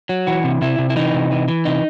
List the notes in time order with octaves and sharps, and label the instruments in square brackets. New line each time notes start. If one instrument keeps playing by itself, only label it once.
[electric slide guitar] F#3
E3 F#4
C3
C3 E4
C3
E4
E3 D#4
C3
E3
E3
C3 D#4